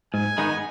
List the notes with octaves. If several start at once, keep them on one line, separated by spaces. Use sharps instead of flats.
G#2 G#5
D#3 G#3 B3 D#4